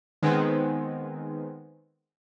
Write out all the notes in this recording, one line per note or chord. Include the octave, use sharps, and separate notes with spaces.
D#3 G#3 B3 C4